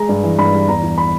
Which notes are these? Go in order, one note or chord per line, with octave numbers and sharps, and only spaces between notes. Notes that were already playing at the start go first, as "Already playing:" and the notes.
Already playing: G#3 A#5
G2
E3
G2 B5
G3
E2 A#5
E2
B5